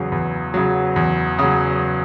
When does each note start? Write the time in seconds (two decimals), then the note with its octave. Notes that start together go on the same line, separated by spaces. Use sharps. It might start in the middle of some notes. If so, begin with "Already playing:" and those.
Already playing: E2 C#3 F#3
0.12 E2
0.54 C#3 F#3
0.96 E2
1.39 C#3 F#3